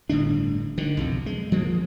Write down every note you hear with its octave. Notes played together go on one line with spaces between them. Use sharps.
G1 A2 D3 D4
D3 D#3
B1 F2 C3
G#3
F3 G#3 A#3